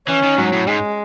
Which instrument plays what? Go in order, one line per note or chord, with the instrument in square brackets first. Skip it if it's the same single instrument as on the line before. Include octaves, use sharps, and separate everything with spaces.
[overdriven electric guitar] E3 [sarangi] C#4
[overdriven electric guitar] D#3
[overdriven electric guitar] G#2 [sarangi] F#3
[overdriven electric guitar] A2
[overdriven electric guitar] G#2 [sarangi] G#3